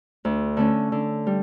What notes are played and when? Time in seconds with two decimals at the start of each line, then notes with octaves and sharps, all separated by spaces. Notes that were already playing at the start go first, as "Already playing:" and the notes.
0.25 D2
0.57 D3 A3 C#4
0.92 D3
1.27 G3